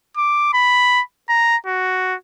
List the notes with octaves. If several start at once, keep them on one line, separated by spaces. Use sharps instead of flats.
D6
B5
A#5
F#4